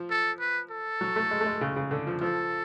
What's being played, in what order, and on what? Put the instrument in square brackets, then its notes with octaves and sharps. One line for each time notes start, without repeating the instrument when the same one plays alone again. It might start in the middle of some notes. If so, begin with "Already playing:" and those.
Already playing: [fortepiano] F3
[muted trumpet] A4
B4
A4
[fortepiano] F#3
A3
G#3
A3
G#3
C#3
C#3
D3
F3
[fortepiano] F3 [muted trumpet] A4